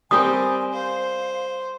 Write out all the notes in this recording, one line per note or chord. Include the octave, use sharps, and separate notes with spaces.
G3 C4 G4 A#4 G#5 D#6
C5 F5